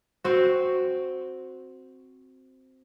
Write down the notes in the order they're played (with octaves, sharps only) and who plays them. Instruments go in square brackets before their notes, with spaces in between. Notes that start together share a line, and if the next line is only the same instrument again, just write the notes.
[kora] C4 F#4